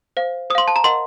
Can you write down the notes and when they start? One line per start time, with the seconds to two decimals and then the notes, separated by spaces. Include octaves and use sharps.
0.17 C5 F5
0.50 C5 D#6
0.55 F5 C6
0.68 A5
0.76 A#5
0.84 A#4 D#5 F#5 C6